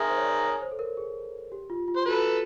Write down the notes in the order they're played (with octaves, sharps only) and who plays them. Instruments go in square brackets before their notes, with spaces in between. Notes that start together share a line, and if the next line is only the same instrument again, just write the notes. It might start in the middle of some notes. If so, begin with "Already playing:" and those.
Already playing: [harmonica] G#4 A#4 [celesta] E5 A#5 C6
[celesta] C5
C#5
D5
C#5
C5
A4
A#4
G#4
G4
F4
F4
[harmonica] C5
[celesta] F#4 [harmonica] A4 B4